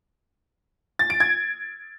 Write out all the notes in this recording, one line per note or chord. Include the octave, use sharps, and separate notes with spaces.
A6
D7
G#6